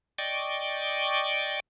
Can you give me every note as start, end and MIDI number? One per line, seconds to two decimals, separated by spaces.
0.18 1.60 74
0.18 1.60 75
0.18 1.60 79
0.18 1.60 85
0.18 1.60 86